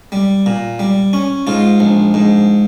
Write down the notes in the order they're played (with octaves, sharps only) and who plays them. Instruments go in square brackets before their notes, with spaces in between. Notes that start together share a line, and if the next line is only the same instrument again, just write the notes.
[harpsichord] G3
A#2
G3
C#4
G#2 F4
A#1
G#2